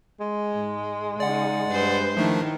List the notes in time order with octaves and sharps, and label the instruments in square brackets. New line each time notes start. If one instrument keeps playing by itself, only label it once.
[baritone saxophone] G#3
[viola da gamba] G#2
[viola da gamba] C#3 D#4 [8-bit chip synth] D5 F#5
[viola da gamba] G2 B4 C5
[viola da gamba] D#3 E4 [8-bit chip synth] F3 A3 D4